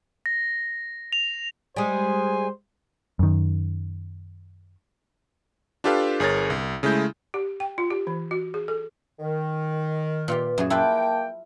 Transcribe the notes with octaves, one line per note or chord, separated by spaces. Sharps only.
A#6
F7
G3 G#3 C5 G#5
F#2 D#3
D4 F4 G4 A4 B4 F5
G1 G#4 A#4 C#5 A6
C2
C#3 G#3 A3 E4 G6
G4
G5
F4
G4
E3
F#4
G#4
A4
D#3
A#2 F4 G4 B4
F#2 G#4 E5
A#3 E4 F4 B4 G5 A5